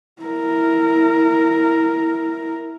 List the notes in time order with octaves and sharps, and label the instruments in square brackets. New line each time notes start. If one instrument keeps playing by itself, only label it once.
[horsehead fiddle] E4 A#4